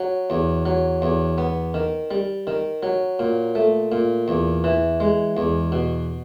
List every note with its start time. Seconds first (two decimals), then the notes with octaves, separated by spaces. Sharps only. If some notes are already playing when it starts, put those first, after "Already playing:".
Already playing: F#3
0.30 E2
0.66 F#3
1.02 E2
1.38 B3
1.74 D#3
2.11 G3
2.47 D#3
2.83 F#3
3.19 A#2
3.55 A3
3.92 A#2
4.28 E2
4.64 E3
5.00 G#3
5.37 E2
5.72 B2